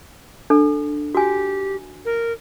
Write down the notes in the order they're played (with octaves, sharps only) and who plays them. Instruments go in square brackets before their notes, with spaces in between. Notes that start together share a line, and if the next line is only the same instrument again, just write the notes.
[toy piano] D4 A4
[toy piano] F#4 G#5 [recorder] G4
[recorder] A#4